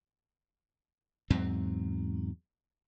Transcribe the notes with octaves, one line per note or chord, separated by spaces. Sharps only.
E2 G#2 F#3 C4